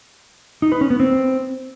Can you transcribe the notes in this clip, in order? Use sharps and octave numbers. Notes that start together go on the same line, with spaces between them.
D#4
B4
C#4
B3
C4